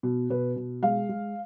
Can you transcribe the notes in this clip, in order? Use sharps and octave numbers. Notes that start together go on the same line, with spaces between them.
B2
B2 B4
B2
G#3 F5
G#3